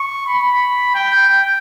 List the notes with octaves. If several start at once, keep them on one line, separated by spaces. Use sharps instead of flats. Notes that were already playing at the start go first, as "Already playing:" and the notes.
Already playing: C#6
B5
G5
G5